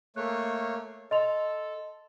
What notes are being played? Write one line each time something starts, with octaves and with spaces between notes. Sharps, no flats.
A3 A#3 C#5 F#6
A4 D#5 C6 F7